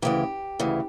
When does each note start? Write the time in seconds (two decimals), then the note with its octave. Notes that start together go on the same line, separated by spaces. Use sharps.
0.02 D2 C#3 E3 G4
0.59 D2 C#3 E3